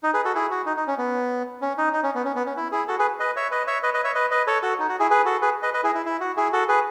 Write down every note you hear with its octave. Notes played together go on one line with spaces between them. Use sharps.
D#4
G#4 B4
F#4 A4
E4 G#4
F#4
D#4
D#4
C#4
B3
C#4
D#4
D#4
C#4
B3
C#4
B3
C#4
E4
E4 G#4
F#4 A4
G#4 B4
B4 D#5
C#5 E5
B4 D#5
C#5 E5
B4 D#5
B4 D#5
C#5 E5
B4 D#5
B4 D#5
A4 C#5
F#4 A4
D#4
F#4
E4 G#4
G#4 B4
F#4 A4
G#4 B4
B4 D#5
B4 D#5
E4 G#4
E4
E4
F#4
E4 G#4
F#4 A4
G#4 B4